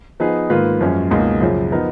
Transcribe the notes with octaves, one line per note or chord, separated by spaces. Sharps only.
F3 B3 D#4 G#4 B4
G#2 D#3 A#3 F4 B4
F#2 F3 G#3 C#4
C#2 B2 A#3 D#4 G#4
F#2 C#3 F3
F3 B3 D#4 A#4